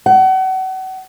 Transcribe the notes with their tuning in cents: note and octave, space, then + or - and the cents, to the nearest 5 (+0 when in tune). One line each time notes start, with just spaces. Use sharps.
F#5 +35